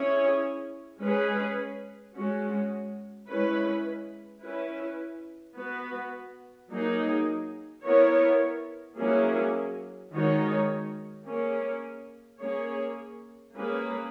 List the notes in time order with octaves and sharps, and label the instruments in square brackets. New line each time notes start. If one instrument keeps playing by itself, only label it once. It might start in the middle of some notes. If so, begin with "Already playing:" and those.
Already playing: [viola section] C#4 E4 G#4 C#5
G#3 C#4 G#4 B4
G#3 C#4 F#4
G#3 C#4 E4 B4
C#4 E4 B4
B3 F#4 B4
F#3 A#3 D#4 G#4
B3 E4 A#4 C#5
F#3 A#3 C#4 E4 G#4
D#3 G#3 D#4 F#4 C#5
A#3 C#4 G#4
A#3 C#4 G#4 C#5
A#3 C#4 G#4 B4